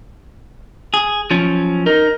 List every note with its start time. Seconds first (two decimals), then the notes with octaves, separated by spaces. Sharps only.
0.94 G#4
1.31 F3 F#3 C#4
1.86 D#4 A#4